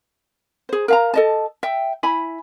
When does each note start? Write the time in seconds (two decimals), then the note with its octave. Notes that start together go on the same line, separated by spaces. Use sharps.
0.69 G#4 C5
0.88 A#4 F5 A#5
1.14 A4 D#5 A5
1.63 E5 G5
2.03 E4 G#5 B5